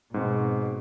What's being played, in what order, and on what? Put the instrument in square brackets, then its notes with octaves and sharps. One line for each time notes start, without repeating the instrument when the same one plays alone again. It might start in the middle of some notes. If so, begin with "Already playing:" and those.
[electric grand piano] G#2 C4 [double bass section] B2